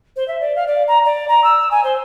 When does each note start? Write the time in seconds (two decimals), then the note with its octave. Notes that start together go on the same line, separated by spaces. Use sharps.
0.16 C5
0.28 E5
0.41 D5
0.55 F5
0.67 D5
0.88 A#5
1.05 D5
1.29 A#5
1.44 E6
1.71 G#5
1.84 C5